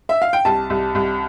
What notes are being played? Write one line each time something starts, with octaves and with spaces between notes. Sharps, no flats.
E5
F5
G5
C2 A5
C2
C2